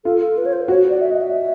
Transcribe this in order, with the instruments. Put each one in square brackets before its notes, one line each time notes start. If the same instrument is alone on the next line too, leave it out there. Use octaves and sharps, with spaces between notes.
[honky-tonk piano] F4 [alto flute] A4
[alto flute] A4
B4
C#5
C5
[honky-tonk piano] F#4 [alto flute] C#5
[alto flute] D5
E5
D#5
E5